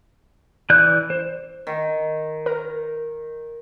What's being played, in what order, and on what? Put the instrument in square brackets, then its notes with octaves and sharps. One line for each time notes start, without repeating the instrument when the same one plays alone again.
[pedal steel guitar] E3 D5 F#6 G6
C5
[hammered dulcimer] D#3
[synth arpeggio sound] A#4